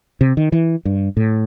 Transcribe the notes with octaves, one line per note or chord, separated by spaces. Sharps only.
C3
D#3
E3
G2
A2